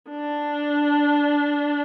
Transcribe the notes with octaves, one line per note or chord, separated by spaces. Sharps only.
D4